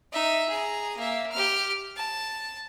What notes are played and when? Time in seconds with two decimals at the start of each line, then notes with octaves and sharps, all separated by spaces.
0.12 D#4 E5
0.49 G#4 A#5
0.97 A#3 E5
1.32 G4 F6
1.97 A5